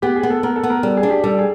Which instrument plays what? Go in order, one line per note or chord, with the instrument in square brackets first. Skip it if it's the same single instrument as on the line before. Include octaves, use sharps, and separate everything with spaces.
[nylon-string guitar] B3 [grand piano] G4
[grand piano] G#4
[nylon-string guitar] B3
[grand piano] A4
[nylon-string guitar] B3 [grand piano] A#4
[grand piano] A4
[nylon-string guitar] B3
[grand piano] A#4
[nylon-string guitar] G3 [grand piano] A4
[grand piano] G#4
[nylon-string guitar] D4
[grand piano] G4
[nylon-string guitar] G3 [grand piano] A4
[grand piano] G#4